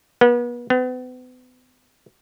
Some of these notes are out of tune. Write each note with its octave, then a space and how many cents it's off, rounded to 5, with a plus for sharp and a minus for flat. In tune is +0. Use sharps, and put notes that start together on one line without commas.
B3 -35
B3 +40